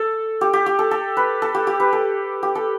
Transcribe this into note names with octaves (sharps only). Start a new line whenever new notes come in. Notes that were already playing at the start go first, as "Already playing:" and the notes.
Already playing: A4
G4
G4
G4
A4
A4
B4
A4
G4
G4
B4
A4
G4
A4